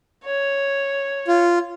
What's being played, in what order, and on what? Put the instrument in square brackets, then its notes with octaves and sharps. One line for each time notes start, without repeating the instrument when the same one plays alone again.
[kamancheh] C#5
[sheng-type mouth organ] F4